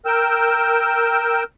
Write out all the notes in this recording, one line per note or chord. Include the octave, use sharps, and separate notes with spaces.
A#4 G5 E6